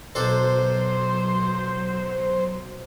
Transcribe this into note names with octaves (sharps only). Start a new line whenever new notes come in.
B1 F#3 D4 A4 C5